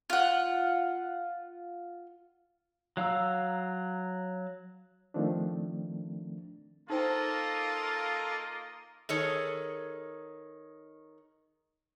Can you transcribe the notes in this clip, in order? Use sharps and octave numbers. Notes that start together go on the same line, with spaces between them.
F4 F#5
F#3 F5 A#5 E6
D#3 F3 A3 C4 D4
A#3 D#4 F4 A4 A#4 C5 D#5 G5
D#3 G#4 A4 C#5